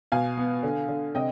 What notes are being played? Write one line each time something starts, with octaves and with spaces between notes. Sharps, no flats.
B2 F5 G#5
B3
D3
D3
C3 D#5 G5